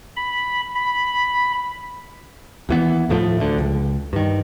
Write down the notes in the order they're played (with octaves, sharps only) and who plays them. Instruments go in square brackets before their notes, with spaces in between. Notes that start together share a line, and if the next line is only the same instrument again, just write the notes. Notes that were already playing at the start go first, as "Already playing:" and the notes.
[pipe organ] B5
B5
[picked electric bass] D#2 E3 B3
D#2 A2 F3 A3
D2 D3
C#2
G2 D#3